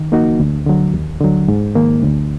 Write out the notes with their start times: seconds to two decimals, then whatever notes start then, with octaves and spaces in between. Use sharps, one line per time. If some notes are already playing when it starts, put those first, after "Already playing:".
Already playing: D#3
0.12 A#3 D#4 F#4
0.40 D2
0.66 D3 F#3
0.94 D#2
1.21 D3 F#3
1.48 G#2
1.75 D#3 A#3
2.03 D2